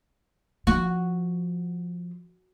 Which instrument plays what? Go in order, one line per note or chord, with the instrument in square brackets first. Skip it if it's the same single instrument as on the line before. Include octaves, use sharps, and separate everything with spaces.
[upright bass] F3 [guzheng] F#4